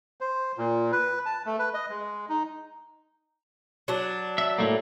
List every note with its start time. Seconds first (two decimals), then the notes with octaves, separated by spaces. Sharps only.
0.21 C5
0.58 A#2
0.92 B4
1.26 A5
1.46 A3
1.59 B4
1.74 D#5
1.89 G#3
2.29 D#4
3.88 F#3 D4
4.38 E5
4.58 A2 A3 A#3